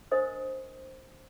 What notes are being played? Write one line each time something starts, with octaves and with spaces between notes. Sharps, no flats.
D4 A#4 C5 D#5 D#6